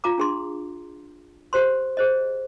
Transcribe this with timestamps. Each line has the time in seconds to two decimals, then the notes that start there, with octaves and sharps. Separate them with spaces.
0.04 F4 F5 A#5 D6
0.18 D4 G#4 C6
1.53 G4 C5 C6
1.97 G#4 C5 D#5